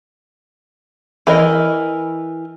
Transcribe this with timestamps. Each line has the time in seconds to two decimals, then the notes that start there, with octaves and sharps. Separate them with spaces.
1.27 E3 A#4 D#5